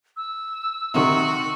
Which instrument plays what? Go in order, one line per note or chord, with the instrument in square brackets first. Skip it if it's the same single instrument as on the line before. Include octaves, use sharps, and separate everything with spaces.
[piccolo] E6
[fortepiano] C3 D#3 [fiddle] F#4